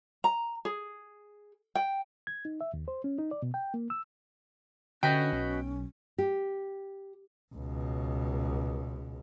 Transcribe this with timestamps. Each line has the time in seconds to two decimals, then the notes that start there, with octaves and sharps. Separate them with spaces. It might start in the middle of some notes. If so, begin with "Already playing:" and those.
0.24 A#5
0.65 G#4
1.75 G5
2.27 G#6
2.45 D#4
2.61 E5
2.74 D#2
2.88 C5
3.04 C#4
3.18 D#4
3.31 D5
3.42 B2
3.54 G5
3.74 A#3
3.90 E6
5.03 D3 C#4 F#4 B4 D#5 G5
5.33 B1
6.18 G4
7.55 C#2 B2